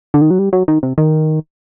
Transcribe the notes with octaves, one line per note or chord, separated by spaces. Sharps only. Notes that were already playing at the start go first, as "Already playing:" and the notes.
D3
D#3
F#3
G3
F#3
D#3
C3
D#3